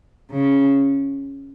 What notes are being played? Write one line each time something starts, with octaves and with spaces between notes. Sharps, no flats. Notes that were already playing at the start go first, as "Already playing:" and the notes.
C#3